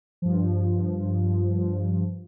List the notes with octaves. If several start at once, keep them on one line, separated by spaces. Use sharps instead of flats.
G2 F3